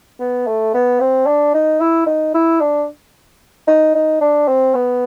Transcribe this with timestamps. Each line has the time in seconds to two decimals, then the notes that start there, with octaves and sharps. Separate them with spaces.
0.20 B3
0.47 A3
0.74 B3
1.00 C4
1.26 D4
1.54 D#4
1.80 E4
2.07 D#4
2.34 E4
2.60 D4
3.67 D#4
3.95 D#4
4.21 D4
4.48 C4
4.75 B3